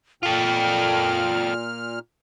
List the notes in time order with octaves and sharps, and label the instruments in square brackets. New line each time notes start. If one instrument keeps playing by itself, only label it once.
[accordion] A#2 F6 [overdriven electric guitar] F4 A4 [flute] G5